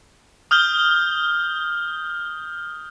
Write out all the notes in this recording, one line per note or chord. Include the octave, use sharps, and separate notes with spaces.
D#6 F6 G6 G7